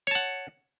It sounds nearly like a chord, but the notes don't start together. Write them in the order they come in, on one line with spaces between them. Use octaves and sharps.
C#5 A5 F#5